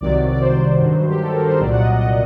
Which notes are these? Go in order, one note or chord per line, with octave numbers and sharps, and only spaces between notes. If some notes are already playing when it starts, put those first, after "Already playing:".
C2 C3 D#3 F#3 D5
D5
C5
G2 D#3 F#3
G4
A4
A#4
C5
C2 A#2 F#3 D5
F#5
D#5
D#5